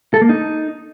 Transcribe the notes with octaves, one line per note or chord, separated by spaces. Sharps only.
A4
A#3
D#4